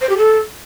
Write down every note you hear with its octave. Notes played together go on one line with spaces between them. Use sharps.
C5
G4
A4